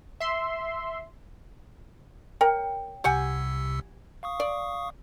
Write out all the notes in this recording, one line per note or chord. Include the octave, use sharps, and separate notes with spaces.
E5 C6
A#4 C#5 G5
C2 C3 G4 F#5 G#5 E6
F5 C#6 D#6
D5